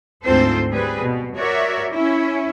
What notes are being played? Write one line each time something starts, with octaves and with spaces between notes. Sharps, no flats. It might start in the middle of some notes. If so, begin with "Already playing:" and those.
D2 G#2 C4 F4 A4 C5
G3 C4 G#4 B4
B2
F#4 A#4 C#5 D5 E5
C#4 E4